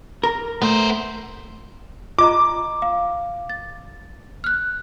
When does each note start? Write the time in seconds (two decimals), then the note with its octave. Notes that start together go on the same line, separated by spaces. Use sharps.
0.23 A#4
0.62 A3 B3 C5
2.19 F4 D#5 A#5 D6
2.82 F5
3.49 A6
4.44 F6 F#6